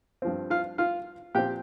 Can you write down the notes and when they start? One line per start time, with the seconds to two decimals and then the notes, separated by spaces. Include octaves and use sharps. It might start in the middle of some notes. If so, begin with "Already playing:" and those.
0.22 G2 F3 C4
0.50 F4 F5
0.78 F4 F5
1.35 A#2 F3 C4 G4 G5